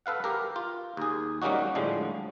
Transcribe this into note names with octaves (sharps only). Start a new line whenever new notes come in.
A4 B4 F5 F#5
G4 A#4
F4
D#2 G#4
F#3 G3 A#3 C#4 D#4 F#4
A2 D3 F3 G3 G#3